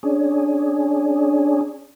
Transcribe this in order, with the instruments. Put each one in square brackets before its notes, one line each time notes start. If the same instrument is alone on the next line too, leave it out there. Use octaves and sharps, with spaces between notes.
[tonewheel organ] C#4 D4 G#4